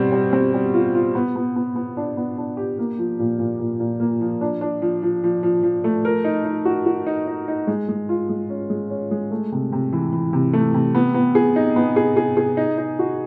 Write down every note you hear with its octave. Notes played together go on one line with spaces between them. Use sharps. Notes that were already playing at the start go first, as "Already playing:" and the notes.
Already playing: B2 G3 C4
G3
C4
G3
F4
F4
B3
B3
B3
B3
D4
B3
D4
G4
A#3
F3
A#2
A#2
A#2
A#2
A#3
F3
D4
D4
F3
F3
F3
F3
F3
A3
A#4
D#4
D#4
F#4
F#4
D#4
D#4
D#4
G#3
G#3
F4
G#3
C#4
G#3
C#4
G#3
A3
C3
C3
E3
E3
C3
A3
C3
B3
B3
G#4
D#4
B3
G#4
G#4
G#4
D#4
D#4
F#4